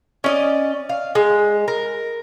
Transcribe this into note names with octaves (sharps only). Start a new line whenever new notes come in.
C#4 D5 D#5
F5
G#3
A#4